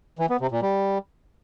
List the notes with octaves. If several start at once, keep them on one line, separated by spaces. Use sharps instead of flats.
E3
B3
C3
A#2
G3